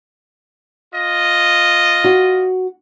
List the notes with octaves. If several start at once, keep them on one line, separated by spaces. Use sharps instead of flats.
F4 D#5
F#4